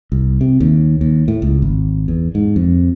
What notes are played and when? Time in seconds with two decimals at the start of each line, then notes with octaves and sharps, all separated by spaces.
0.12 C2
0.41 C3
0.60 D#2
1.01 D#2
1.28 A2
1.42 C#2
1.62 G#1
2.08 E2
2.35 G#2
2.56 F2